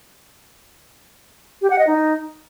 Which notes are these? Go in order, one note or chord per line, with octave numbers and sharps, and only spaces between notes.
G4
F#5
D#5
D#4